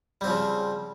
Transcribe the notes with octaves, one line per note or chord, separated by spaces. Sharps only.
C#3 F3 G3 C4